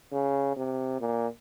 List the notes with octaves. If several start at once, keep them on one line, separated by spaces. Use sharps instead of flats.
C#3
C3
A#2